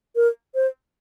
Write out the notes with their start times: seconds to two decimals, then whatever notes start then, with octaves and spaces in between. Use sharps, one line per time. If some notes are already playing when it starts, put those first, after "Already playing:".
0.16 A#4
0.55 C5